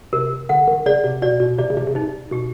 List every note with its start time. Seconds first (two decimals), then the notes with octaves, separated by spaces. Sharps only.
0.13 C3 A#4
0.49 D3 F#5
0.68 D#3
0.86 C#3 D5
1.04 C3
1.22 B2 D5
1.40 B2
1.58 C3 D5
1.70 C#3
1.77 C3
1.87 C#3
1.95 C3 D#4
2.31 B2 G4